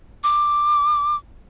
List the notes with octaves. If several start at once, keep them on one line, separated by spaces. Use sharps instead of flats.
D6